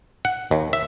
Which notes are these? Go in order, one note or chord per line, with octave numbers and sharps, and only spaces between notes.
F#5
D#2
E5